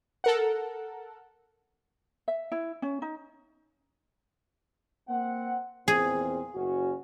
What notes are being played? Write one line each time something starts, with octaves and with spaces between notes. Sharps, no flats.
A4 A#4 F#5
E5
E4
C#4
D#4
A#3 C4 F#5
E2 A#2 C4 G#4
F#1 C#4 F#4